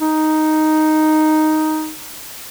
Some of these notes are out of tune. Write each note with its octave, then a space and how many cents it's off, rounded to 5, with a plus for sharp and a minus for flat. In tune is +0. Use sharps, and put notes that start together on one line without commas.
D#4 +0